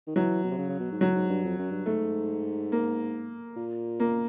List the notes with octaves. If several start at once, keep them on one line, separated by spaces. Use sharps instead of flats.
D#3
E3 F#3
B2
C3
C#3
C#3
B2
G#2
A2 F#3
G#2
G2
F2
F#2
G2
G#2 A3
A#3
A#2
A#3